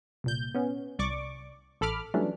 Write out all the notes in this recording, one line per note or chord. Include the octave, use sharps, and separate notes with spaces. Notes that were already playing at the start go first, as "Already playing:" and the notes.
C2 A#2 G6
B3 C#4
C2 D5 C#6 D6
A1 A4 B5 D6 F6
E3 F#3 G3 A3 C#4 D4